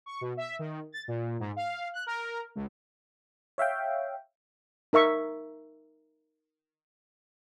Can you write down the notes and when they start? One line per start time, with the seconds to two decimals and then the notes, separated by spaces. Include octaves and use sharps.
0.06 C#6
0.21 B2
0.37 E5
0.59 D#3
0.92 A6
1.08 A#2
1.40 G#2
1.56 F5
1.94 F#6
2.06 A#4
2.56 C#2
3.58 C#5 E5 F5 G5
4.93 D#4 A#4 E5 C#6